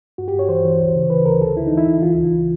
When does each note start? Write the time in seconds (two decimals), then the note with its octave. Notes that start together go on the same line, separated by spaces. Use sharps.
0.18 G2 F#4
0.28 G4
0.34 G2 C#5
0.49 E3 C5
0.65 E3
0.80 D2
0.95 C#3
1.10 E3 B4
1.26 D2 A#4
1.41 D2 A4
1.56 D2 E4
1.67 D#4
1.72 E3
1.78 E4
1.88 D2
2.02 E3 F4
2.18 C#2